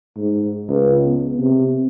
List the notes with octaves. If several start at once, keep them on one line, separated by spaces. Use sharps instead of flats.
G#2
C#2
B3
C3